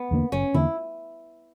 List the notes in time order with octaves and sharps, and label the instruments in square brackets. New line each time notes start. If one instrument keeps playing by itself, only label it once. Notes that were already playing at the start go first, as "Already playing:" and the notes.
Already playing: [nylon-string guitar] B3
[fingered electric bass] E2 D3 A#3
[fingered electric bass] F#1 [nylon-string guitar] C#4
[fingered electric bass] E2 D3 A#3 [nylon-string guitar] E4